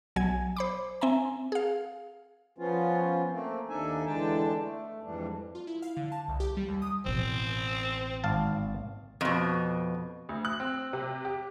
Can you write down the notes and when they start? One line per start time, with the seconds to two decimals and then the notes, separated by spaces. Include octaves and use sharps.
0.16 B1 F#3 G#5 G#6
0.57 C5 B5 D6
1.01 C4 E5 G#5 A#5
1.52 G#4 F5
2.58 F3 B3 C#4 F4
3.32 A3 A#3 C4
3.69 D#2 D4 D#4 A4 E5 G#5
4.06 E2 D3 G#3 D4 G5 A5
4.61 A3
5.03 F2 G#2 E3 G3 D4
5.55 F4
5.67 E4
5.82 F5
5.97 D3
6.12 A5
6.28 C2
6.40 G4
6.57 G3
6.69 D#2
6.82 D#6
7.05 A1 B2 C4
8.24 G#1 F5 A5
9.21 F2 B2
10.29 D2
10.45 F#6
10.60 C4
10.93 C3
11.25 G4